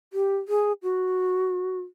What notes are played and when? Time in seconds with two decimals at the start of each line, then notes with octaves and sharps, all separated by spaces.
0.13 G4
0.48 G#4
0.83 F#4